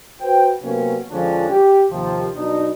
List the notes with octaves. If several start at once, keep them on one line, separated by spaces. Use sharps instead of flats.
F#4 B4 C5 G5
C3 F#3 A#3 B3 C#4
F2 D3 F3 G#3 C#4 D4
G4
D#2 C3 F3
B2 F#3 D4 D#4